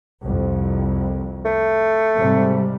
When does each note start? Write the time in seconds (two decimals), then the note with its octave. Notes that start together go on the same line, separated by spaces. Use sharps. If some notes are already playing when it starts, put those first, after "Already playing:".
0.23 C2 F2
1.45 A3
2.18 G#2 C3 G3